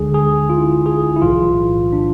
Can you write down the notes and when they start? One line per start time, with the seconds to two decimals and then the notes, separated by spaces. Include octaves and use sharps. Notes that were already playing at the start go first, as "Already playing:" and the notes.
Already playing: D2 D3 G#3 G#4
0.14 G#4
0.50 F4
0.57 E4
0.64 F4
0.86 G#4
1.16 E4
1.21 B1 A2 E3 F4
1.92 D4